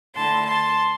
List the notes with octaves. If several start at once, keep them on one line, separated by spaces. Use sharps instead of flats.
D3 A3 E4 A5 C6
A5 C6